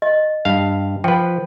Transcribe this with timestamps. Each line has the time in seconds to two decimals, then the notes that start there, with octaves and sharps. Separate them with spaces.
0.02 D#5
0.45 G2 F5
1.04 F3 B4 G5